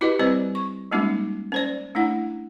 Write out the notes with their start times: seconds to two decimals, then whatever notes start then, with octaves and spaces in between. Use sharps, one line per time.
0.01 E4 F#4 G4 B4 D#5
0.19 G3 C4 B4 C5 D5 D#5
0.55 C#6
0.91 G3 G#3 A#3 C#4 D#4 F#4
1.52 C#4 C5 D5
1.95 A3 D4 E4 F#5